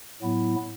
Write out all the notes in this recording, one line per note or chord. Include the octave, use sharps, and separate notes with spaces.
A2 F#3 B3 E4